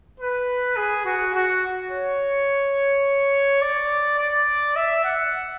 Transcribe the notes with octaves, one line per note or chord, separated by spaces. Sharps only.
B4
G#4
F#4
F#4
C#5
D5
D5
E5
F#5